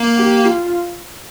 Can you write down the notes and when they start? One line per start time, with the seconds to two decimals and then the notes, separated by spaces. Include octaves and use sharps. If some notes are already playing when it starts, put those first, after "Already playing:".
Already playing: A#3
0.17 G4
0.45 F4